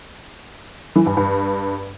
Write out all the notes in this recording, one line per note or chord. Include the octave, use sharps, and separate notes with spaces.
E3
G2
G2